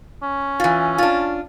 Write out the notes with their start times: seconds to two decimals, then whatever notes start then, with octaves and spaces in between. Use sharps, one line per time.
0.23 C#4
0.60 E3 F4
0.98 D4 F4